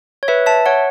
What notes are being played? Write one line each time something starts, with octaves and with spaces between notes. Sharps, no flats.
C#5
B4 E5
E5 A5
C#5 F#5